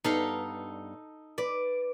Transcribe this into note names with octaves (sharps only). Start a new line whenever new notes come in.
G2 G3 B3 D#4 A4 F5
B4 D5